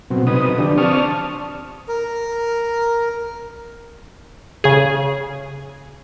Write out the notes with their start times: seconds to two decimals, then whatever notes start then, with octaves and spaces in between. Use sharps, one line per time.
0.11 B2 F#3 C4
0.27 C3 D#4 B4 D#6
0.58 D3 F3 D4 G4
0.78 C4 D5 A5 C#6 D#6 F6
1.88 A#4
4.64 C#3 G#4